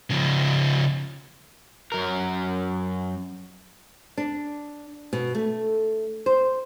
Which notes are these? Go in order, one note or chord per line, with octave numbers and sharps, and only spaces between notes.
C#3 F3
F#2 A#4
D4
B2
A3
C5